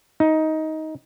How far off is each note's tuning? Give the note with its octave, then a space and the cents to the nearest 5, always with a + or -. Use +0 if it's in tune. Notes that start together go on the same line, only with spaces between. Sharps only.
D#4 +15